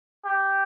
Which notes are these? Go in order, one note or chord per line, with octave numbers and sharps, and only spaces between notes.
G4